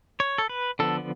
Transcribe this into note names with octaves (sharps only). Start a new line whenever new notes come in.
C#5
A4
B4
D3 F3 B3 A4